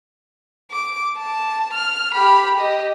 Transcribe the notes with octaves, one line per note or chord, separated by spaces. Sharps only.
D6
A5
F6
G4 B5
G4 D#5